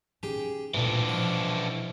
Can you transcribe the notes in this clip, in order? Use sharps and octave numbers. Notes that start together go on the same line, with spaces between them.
C#4 D#4 G4 G#4 G5
D2 A#2 E3 D4
B2 F3